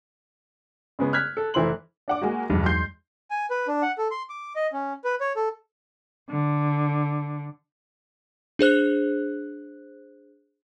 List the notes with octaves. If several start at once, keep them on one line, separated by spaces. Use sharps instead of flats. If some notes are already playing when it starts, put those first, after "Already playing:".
C#3 G#3 B3
F6 F#6 G#6 B6
A4
F1 E3 E4 C5 C6 F#7
D4 F#5 D6
G#3 A#3 F#4
B1 E2 G2 F#3 G#3
C6 G6 C7
G#5
B4
D4
F#5
A4
C6
D6
D#5
C#4
B4
C#5
A4
D3
D4 G#4 C5 F#6